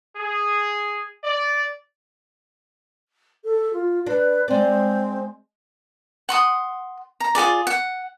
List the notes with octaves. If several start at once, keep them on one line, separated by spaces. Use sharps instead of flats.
G#4
D5
A4
F4
D4 B4
G#3 C4 D5
F#5 C6 D#6
A#5
F4 F#4 G#4 D5
F#5